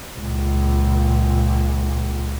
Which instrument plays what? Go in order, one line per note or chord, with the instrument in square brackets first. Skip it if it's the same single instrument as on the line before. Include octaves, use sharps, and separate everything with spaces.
[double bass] C#2 A#2